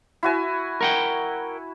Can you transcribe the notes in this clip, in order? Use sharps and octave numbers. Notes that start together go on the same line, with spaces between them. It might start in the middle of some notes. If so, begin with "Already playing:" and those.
E4 F#4 G#5
A#4 F#5 G5